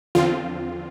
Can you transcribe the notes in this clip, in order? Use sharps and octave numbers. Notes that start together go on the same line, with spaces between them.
E2 D3 F3 C4 F4